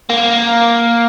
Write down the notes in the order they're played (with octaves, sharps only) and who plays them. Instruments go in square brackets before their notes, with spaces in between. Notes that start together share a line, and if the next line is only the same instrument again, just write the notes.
[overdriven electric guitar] A#3